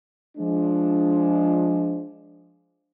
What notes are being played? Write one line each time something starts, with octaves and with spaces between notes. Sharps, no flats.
F3 G#3 D4